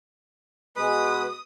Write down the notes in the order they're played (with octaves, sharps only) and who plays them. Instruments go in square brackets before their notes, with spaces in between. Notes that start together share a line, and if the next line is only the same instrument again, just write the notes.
[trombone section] B2 G#3 [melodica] B4 [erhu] D#6